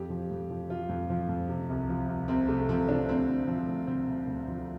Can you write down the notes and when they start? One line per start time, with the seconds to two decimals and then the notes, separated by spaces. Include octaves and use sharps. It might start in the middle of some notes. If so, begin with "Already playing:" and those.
Already playing: F2 G4
0.10 F3
0.31 F2
0.50 F3
0.69 F3 F4
0.89 F2
1.10 F3
1.29 F2
1.49 C3
1.69 C2
1.89 F3
2.08 C2
2.28 C2 C4
2.48 C3 A3
2.69 F3 C4
2.88 F3 D4
3.09 D2 C4
3.28 D2
3.47 F3
3.67 D2
3.87 D2 C4
4.07 D2
4.27 D2
4.48 F3